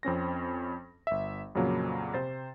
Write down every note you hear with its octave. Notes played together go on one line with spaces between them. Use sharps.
F2 C4 C#4 A#6
G1 E5
F2 A#2 C#3 F#3 A#3
C3 C5 A6